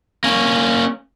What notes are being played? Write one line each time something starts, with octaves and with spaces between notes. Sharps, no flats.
A#3 C#4